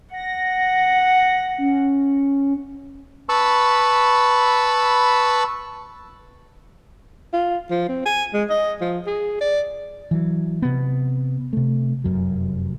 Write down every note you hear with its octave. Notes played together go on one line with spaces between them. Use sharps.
F#5 A#6
C#4
B4 A5 B5 C#6 E6
F4
F3
C4
G#5
G#3
D#5
F3
G#4
D5
E3 F#3
C3 B3
C3 A3
F1 F#2 F#3